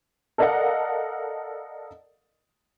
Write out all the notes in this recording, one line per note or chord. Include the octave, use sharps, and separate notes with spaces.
A4 A#4 D5 D#5 F5 F#5